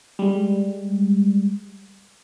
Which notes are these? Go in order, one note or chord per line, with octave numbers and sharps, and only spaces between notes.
G3 G#3